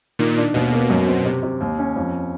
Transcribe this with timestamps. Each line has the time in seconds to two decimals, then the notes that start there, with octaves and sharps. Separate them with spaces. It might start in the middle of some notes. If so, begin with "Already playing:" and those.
0.19 A#2 D#3
0.37 D4
0.54 D#2 B2
0.72 A#3
0.90 F#2
1.07 C4
1.26 C3
1.43 C3
1.61 D#2
1.79 C#4
1.96 F2